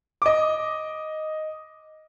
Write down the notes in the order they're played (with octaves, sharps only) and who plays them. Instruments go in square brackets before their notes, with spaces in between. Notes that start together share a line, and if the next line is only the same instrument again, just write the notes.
[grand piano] D#5 D6